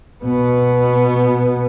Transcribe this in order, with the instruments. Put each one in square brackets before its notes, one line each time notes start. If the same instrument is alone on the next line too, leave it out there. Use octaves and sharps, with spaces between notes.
[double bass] B2 B3